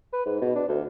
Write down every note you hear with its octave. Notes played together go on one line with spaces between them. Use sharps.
B4
G#2
B2
D4
D2